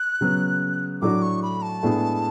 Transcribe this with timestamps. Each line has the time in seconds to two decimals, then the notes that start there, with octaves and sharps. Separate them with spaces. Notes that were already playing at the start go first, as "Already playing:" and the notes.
Already playing: F#6
0.21 C#3 F#3 B3
1.02 A2 F#3 A3 D4 F#4 D6
1.22 C#6
1.43 B5
1.62 A5
1.83 A2 G#3 B3 D4 G#4